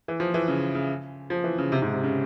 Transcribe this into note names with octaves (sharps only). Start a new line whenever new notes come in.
E3
F3
E3
C#3
C#3
F3
E3
C#3
C3
G#2
C3
C#3